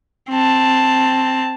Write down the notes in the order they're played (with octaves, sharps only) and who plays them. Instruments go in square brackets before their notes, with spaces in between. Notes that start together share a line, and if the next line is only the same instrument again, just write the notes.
[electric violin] C4 A5